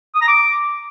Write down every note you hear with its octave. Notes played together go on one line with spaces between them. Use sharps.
D#6
A#5
D6